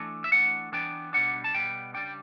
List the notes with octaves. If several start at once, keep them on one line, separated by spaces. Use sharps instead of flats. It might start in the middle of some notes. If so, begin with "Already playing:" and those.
Already playing: E3 A3 D4
E5
E3 A3 D4 F#5
E3 B3 D4 G5
B2 G3 D4 F#5
A5
B2 G3 B3 G5
C#3 G3 D4 G5